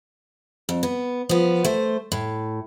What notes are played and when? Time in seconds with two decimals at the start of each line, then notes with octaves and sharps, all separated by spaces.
0.69 F2
0.83 B3
1.29 F3 B3
1.65 A3 C5
2.12 A2